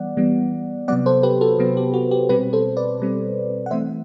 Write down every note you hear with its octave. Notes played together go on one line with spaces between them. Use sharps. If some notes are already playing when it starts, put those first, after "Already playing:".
Already playing: E3 G3 B3 D5 F#5
E3 G3 B3
C3 F#3 B3 D5 F#5
A4 C5
G4 B4
F#4 A4
C3 F#3 B3
G4
F#4
G4
B2 G3 C4 G4 B4
A4 C5
B4 D5
B2 G3 C4
F#5
E3 A3 C4 C5 E5